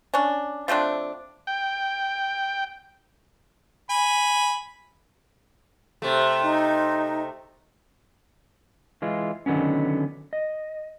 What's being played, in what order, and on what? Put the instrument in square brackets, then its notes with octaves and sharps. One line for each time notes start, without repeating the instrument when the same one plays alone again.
[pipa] C#4 D4
F3 A3 C4 D4
[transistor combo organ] G5
[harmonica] G#5 B5
[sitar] C3 A3 [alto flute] E5
[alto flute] D#4
[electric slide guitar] E3 G#3 F4
D3 D#3 F#3 B3 C#4
D#5